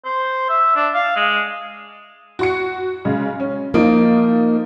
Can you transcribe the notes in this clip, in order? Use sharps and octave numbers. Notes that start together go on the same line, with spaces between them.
C5
E5
D4
F5
G#3
F#4 C#6 C#7
C#3 G#3
C#4
F3 A#3 D#4 D7